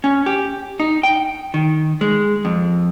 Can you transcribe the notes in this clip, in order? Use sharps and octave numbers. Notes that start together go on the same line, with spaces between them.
C#4
G4
D#4
G5
D#3
G#3
F2